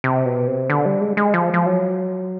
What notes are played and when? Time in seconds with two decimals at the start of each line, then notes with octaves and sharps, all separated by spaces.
0.04 C3
0.26 B2
0.47 C3
0.70 D3
0.86 G3
1.01 G#3
1.17 G#3
1.34 F3
1.54 F3
1.66 F#3